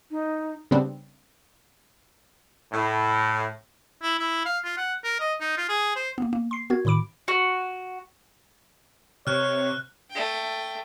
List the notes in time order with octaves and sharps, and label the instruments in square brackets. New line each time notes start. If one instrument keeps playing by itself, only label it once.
[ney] D#4
[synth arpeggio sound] C#3 G3 B3 C4 D4
[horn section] A2
[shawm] E4
E4
F5
F4
F#5
A#4
D#5
D#4
F4
G#4
C5
[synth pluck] A#3 B3
A#3
C6 C7
B3 F#4 A#4 G#6
A2 D#3 B5 D6 D7
[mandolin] F#4
[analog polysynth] C3 [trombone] C#5 [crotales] F6 F#6
[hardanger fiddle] A3 G5